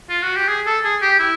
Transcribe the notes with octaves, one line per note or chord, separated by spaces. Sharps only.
F4
F#4
G4
G#4
A4
G#4
G4
E4